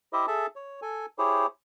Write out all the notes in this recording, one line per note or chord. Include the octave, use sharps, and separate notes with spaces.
E4 G4 C5 D#5 E5
G#4 A4 E5 A5
C#5
A4 G#5
E4 G4 G#4 C5 C#5